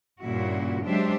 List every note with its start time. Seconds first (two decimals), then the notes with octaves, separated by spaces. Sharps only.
0.21 G2 A#2 C#3 E4 F#4
0.84 F#3 G#3 D4 G4 C5 E5